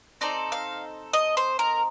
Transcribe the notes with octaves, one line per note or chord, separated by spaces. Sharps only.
C4 D#4 A4 D5
F5
D#5
C5
A#4